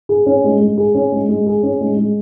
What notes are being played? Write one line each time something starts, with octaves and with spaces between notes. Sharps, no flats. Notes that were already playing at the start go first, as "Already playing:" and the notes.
G#4
C#4
G#3
G#3
G#4
C#4
G#3
G#3
G#4
C#4
G#3
G#3